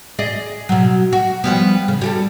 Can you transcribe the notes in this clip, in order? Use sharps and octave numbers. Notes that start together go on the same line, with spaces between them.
G#4 D5 D#5
B2 F#3
F#4
F3 G3 B3
C#3
G3 G4 A4